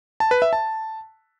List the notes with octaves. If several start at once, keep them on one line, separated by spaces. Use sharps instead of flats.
A5
B4
E5
A5